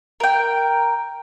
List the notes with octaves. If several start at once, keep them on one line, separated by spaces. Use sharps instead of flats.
A#4 G5